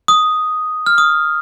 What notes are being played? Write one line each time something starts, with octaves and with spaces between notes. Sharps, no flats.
D#6
F6
D#6